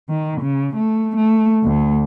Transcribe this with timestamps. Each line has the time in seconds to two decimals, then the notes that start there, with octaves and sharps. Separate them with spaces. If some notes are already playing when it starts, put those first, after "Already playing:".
0.10 D#3
0.41 C#3
0.76 A3
1.16 A3
1.64 D2